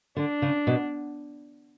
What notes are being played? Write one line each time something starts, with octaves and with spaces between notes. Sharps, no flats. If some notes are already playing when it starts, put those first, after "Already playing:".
D3 D4
C#3
B2